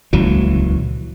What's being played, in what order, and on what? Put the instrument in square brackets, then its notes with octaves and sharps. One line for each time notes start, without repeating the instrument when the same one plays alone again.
[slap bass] D#1 C#2 E3 F#3